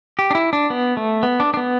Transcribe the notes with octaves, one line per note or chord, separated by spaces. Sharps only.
G4
D4
E4
D4
B3
A3
B3
D4
D4
B3